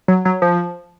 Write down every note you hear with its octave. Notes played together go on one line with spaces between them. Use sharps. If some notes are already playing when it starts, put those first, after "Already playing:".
F#3
F#3
F3